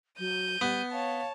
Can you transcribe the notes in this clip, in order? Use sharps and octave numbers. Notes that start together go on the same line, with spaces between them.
F#3 G6 D#7
G3 B3
C#5 F5 A5